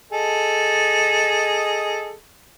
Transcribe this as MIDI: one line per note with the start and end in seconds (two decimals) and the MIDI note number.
0.12 2.13 68
0.12 2.13 69
0.12 2.13 75